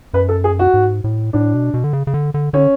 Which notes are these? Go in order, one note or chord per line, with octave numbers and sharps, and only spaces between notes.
F#2 B4
A4
G#4
F#4
G#2
A2
A2 D4
B2
B2
D3
C#3
C#3
D3
D3
D3 C#4